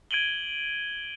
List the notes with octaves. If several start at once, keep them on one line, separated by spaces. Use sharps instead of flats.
G#6 D7 D#7 F#7 G7